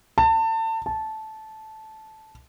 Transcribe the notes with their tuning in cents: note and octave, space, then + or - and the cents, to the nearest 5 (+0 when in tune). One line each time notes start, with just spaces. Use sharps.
A5 +30
A5 -10